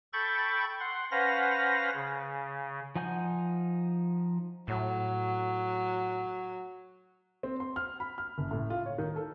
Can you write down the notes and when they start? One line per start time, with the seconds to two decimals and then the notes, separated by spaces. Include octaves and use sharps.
0.13 A4 G5 B5 C#6 G6 A6
0.80 F#5 C6
1.11 C#4 B4 C5 F5 F#5 A#6
1.94 C#3
2.96 F3 D#4 F#5 G#5 G6
4.68 A2 F#3
7.43 C4
7.60 C6
7.76 F6
8.00 B5
8.18 F6
8.38 F#1
8.51 A2
8.70 F4
8.86 C#5
8.98 D#3
9.16 A4